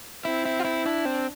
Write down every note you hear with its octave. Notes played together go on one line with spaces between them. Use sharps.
C4 E4
E4
F4
E4
D4 E4
C4